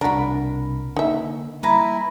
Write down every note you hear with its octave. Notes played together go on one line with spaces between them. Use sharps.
C2 B2 D4 F#4 A#4 B5
D3 A#3 D#4 E5
G3 A#3 E4 B4 G#5 A#5